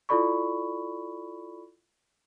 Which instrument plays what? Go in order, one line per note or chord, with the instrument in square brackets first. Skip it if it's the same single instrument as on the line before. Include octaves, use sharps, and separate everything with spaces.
[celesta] E4 F4 A4 D5 B5 C#6